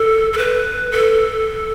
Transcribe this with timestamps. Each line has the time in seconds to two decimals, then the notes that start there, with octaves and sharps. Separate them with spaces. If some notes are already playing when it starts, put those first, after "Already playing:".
Already playing: A4
0.33 A4
0.38 B4
0.92 A4